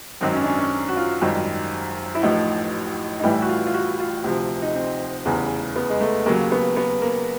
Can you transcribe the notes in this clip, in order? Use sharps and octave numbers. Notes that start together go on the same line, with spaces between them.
G#1 F#2 D#3 F#3 C4
C#4
D4
C#4
C#4
F#4
F4
G#1 F#2 D#3 G3
E4
A1 A2 F3 D#4
D#4
A1 A2 E3 G3 E4
F#4
F4
F4
F#4
F4
D2 C3 F3
D#4
C4
F1 E2 C#3 E3
B3
G#3
A3
D#2 C#3 F#3 A#3
B3
B3
A#3